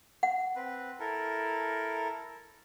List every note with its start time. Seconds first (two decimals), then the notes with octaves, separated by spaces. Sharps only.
0.23 F#5
0.56 C4 B4
1.00 E4 A4 A#4